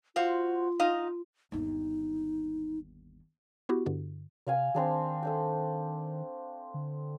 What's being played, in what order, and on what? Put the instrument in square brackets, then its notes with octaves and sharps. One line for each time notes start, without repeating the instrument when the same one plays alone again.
[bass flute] F4 [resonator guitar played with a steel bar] F#4 C5 F5
[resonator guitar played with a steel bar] D#4 D#5 F5
[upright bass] G1 D#2 [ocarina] D#4
[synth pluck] B3 E4 F#4 G4
G2 D3
[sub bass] C3 [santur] D5 F5 G#5
[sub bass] D#3 [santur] C4 D4 G#4
[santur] A3 D4 G5
[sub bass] D3